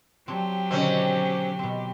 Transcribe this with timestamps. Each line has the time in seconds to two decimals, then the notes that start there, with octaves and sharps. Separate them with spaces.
0.28 F#3 C4 D4 G4 C#5
0.71 B2 D3 D#3 C4 C#4
1.59 B2 C4